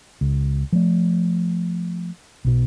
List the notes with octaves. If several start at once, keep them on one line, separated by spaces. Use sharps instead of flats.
C#2
F3 A3
B1 B2